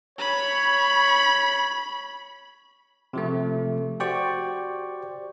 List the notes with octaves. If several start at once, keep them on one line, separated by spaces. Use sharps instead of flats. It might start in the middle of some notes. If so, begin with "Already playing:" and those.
C#5 B5
C3 F3 A3
F#4 G4 C5 D5 G5 C#6